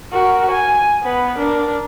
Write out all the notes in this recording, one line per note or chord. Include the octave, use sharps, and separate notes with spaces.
F#4 A#4
G#5
B3 B4
D4 A#4